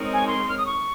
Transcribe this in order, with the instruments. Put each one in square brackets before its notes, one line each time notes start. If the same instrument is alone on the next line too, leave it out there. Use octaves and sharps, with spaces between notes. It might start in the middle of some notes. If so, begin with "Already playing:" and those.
Already playing: [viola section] G#3 C4 D#4 A#4 C#5
[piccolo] G#5
C6
F6
D#6
C#6